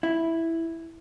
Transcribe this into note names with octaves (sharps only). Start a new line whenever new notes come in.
E4